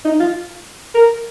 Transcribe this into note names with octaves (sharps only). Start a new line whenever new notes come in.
D#4
F4
A#4